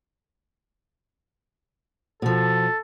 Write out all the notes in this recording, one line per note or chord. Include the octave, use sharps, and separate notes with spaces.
B2 F3 A4